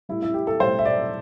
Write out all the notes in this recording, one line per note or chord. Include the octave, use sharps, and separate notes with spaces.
A2 G3 E4
E4
G4
A4
A2 G3 C5
E5
D5